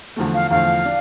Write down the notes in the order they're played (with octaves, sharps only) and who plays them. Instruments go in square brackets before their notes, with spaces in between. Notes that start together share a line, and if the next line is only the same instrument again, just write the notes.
[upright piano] E2 D3 F3 A3
[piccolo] F5
[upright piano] E2 D3 F3 A3 [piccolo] F5
[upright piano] D4